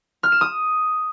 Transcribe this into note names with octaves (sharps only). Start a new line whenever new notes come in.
F6
E7
D#6